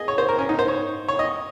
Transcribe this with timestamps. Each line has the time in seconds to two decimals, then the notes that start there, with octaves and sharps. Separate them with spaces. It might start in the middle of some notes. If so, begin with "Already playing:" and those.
Already playing: G#4 D#5
0.08 C#5
0.18 C5
0.29 A#4
0.38 C#4
0.49 D#4
0.59 C5
0.68 C#5
1.08 C#5
1.19 D#5